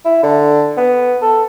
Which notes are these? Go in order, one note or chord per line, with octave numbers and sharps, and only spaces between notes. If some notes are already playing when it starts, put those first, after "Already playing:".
E4
D3
B3
A4